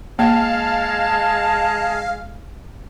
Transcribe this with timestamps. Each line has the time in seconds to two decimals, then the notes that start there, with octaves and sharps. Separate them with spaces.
0.19 G#3 A#3 F5 A5